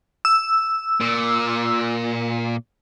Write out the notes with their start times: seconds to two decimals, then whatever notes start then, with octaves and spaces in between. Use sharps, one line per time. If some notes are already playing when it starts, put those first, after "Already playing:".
0.25 E6
1.00 A#2